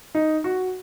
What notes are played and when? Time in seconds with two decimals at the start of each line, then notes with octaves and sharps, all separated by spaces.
0.15 D#4
0.44 F#4